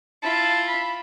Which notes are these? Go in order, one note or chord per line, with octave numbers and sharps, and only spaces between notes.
E4 F4 A5
B5